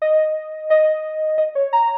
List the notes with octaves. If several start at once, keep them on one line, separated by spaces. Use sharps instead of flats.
D#5
D#5
D#5
C#5
A#5